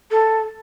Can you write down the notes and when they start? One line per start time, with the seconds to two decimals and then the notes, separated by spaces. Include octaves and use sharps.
0.11 A4